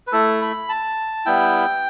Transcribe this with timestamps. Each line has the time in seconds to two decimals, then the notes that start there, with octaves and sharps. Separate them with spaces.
0.07 B4
0.12 A3 E4 A4
0.42 B5
0.69 A5
1.26 G3 B3 E4 G5